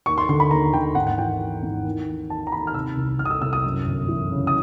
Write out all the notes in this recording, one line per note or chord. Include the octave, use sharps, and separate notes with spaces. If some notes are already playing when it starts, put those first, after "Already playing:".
D#2 C#6
C6
D3 C6
B5
D#2 A#5
D3 G5
G#1 F#5
F#5
E3 G5
E3
G#1
D#2
E3
D#2 A5
A#5
D#2 B5
F6
C3 E6
C2
C2 F6
D#6
E6
C2 E6
D#6
F#2
G1
E3
C#3
D#6